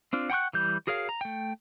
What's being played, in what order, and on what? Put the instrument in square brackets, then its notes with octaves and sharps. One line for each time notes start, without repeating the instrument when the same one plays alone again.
[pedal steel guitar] C4 D4 F4
F#5 G5 B5 C#6 F#6
E3 G3 G6
F#4 G#4 A#4 C#5 F5
A#5
A3 G5